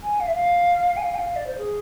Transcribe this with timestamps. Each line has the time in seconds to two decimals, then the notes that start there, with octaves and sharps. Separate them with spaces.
0.03 G#5
0.20 F5
0.27 E5
0.34 F5
0.96 G#5
1.02 F5
1.14 G#5
1.19 F5
1.36 D5
1.47 C5
1.58 G#4